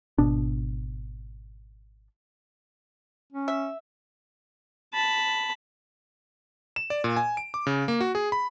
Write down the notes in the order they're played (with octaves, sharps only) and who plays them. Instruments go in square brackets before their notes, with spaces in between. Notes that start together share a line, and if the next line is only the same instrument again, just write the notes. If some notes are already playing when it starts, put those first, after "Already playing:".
[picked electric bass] G#1 B2 D4
[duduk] C#4
[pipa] E5
[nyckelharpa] A5 B5
[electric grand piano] E7
D5
A#2
G#5
D7
D6
C#3
A#3
F#4
G#4
B5